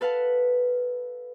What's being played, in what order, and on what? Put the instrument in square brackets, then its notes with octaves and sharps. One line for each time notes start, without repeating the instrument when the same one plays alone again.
[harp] A4 B4 F5 F#5 A5